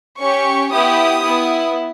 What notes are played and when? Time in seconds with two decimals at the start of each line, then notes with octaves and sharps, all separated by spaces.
0.19 C#4 G4 C#6
0.71 B3 E4 G4 D#6
1.24 B3 E4